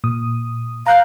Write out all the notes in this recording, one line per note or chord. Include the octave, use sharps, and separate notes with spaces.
A#2 D#6
F5 A#5 F#6 G6